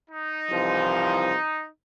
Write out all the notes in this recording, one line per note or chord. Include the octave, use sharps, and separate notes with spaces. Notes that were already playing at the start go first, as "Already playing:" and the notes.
D#4
C2 E3 F3